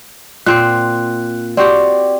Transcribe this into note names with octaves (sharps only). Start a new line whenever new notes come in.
A#2 C4 C5 F#6
C4 F#4 G4 D5